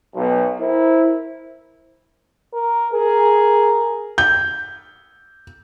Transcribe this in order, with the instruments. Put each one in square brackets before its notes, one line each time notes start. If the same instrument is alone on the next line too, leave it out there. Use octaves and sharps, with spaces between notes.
[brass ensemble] B1
E4 A#4 C5
[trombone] A#4
[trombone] G#4 [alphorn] A#4
[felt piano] G6